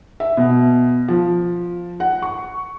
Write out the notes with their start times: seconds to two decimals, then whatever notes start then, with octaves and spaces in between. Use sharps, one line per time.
0.20 E5
0.37 B2
1.08 F3
2.00 F#5
2.22 C#6